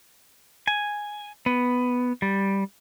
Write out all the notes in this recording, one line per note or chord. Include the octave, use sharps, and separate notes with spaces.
G#5
B3
G3